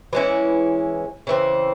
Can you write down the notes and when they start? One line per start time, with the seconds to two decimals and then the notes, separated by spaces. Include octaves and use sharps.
0.13 E3 G#3 C#4 E4
1.27 C#3 E3 C4